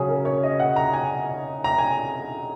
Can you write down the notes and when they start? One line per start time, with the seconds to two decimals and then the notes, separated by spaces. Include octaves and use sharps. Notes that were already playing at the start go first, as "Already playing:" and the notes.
Already playing: C#3 F#3 C#4 G#4
0.08 A#4
0.25 C#5
0.43 D#5
0.60 F#5
0.76 A#5
0.94 G#5
1.64 A#5
1.78 G#5